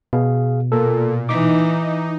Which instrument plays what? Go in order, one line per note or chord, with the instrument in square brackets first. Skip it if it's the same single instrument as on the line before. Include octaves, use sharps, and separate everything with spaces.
[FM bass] B2 [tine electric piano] G#4 F5
[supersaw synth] A#2 [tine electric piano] A4 A#4
[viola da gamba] E3 [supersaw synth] D#4 [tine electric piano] D6